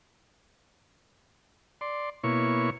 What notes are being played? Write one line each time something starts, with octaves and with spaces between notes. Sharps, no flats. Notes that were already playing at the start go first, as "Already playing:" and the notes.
D5 C6
B2 A#3 E4 C#5 C#6